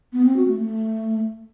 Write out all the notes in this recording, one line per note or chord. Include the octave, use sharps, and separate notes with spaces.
B3
C4
F#4
A3
A3